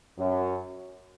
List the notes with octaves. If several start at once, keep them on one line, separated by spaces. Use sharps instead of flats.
F#2